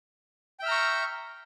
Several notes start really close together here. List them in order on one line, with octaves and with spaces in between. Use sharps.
G5 E5 F6 A#5 C#6